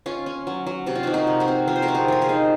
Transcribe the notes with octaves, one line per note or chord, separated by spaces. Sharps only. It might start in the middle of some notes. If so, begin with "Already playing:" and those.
C#4 F4
C#4
F#3
F#3
C3 F#4
F4
F3 D#4 F#4
F#4 A#4
C3
F#4 A#4
C4
F3 A#4
C5
F#4 A#4
C4
F4 G#4
F3 A#4
G#4 C5
D#4